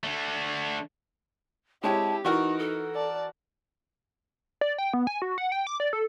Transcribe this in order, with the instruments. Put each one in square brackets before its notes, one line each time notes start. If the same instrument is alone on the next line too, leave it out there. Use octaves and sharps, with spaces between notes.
[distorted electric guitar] D3 A3
[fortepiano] G#3 C4 C#5 [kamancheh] E4 G4 [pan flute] A5
[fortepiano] E3 F#4 A#4 [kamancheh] D#4 [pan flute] C#6
[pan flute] A4
[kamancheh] D5 A5
[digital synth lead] D5
G5
B3
G#5
F#4
F#5
G5
D6
D5
A4